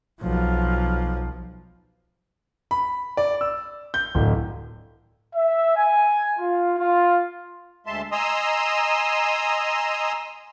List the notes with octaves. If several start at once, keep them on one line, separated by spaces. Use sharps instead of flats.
B1 F3
B5
D5
E6
G6
D1
E5
G#5
F4
F4
D2 G#3 E5 A5 C6
D#5 G#5 A#5 C6 D#6 E6